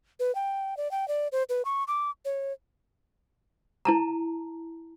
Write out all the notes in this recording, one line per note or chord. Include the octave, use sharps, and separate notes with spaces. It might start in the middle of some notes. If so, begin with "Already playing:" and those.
B4
G5
D5
G5
D5
C5
B4
C#6
D6
C#5
E4 A5 A#5